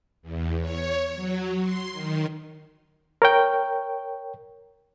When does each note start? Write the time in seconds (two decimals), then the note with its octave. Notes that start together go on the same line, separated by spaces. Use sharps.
0.22 E2
0.61 C#5
1.15 F#3
1.61 C6
1.92 D#3
3.22 A#4 C#5 G5